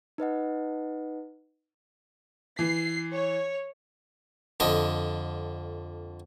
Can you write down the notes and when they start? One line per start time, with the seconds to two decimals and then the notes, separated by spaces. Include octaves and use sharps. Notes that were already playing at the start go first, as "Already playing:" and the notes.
0.18 D#4 B4 D#5 F#5
2.59 E3 C7
3.12 C#5
4.60 F2 D3 D#5